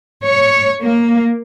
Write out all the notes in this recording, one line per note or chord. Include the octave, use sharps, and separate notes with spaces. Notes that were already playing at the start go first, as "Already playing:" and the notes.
C#5
A#3